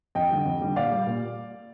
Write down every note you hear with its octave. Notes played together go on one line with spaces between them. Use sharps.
F2 D#5 G5
D3 G3
F2
D3 G3
A#2 D5 F5
G3
A#2